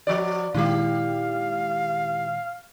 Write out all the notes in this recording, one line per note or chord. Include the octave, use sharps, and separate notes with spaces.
F3 F#4 D5
A#2 D#3 G#3 E4 G4 F5